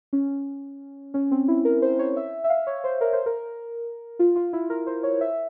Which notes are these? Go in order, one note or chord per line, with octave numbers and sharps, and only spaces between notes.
C#4
C#4
C4
E4
A#4
C5
C#5
E5
E5
F5
C#5
C5
A#4
C5
A#4
F4
F4
E4
A#4
C5
C#5
E5